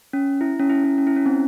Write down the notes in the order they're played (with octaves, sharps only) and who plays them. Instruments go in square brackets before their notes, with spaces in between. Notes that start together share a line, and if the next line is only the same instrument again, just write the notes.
[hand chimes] C#4
E4
C#4
E4
C#4
C#4
E4
C#4
C4